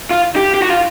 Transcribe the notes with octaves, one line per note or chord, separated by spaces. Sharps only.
F4
G4
G4
F#4
F4